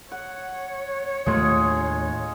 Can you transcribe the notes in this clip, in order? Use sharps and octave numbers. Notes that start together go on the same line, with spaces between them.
C#5 F#5
D#2 A2 G#3 A3 F4 G#4